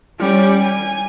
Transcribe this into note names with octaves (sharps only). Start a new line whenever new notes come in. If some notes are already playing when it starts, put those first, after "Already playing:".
G3 C#4
G#5